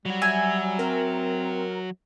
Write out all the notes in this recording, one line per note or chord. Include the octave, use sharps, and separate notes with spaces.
F#3 G3 F#4
E5 G#5
C4 A#4